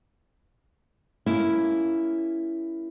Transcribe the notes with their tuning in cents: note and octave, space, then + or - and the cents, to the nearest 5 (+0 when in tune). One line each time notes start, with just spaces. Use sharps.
A#3 -10 C#4 +0 E4 +0